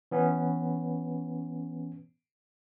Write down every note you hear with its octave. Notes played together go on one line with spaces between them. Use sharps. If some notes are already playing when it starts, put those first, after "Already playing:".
E3 B3 C#4